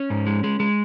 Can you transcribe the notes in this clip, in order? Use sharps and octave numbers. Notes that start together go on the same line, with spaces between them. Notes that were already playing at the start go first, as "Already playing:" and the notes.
Already playing: C#4
G#2
G#3
G#3
G#3